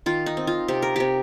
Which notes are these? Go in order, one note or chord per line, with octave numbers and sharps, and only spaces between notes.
D#3 F4
D#4
C4
F4
C3 G4
A#4
C3 G4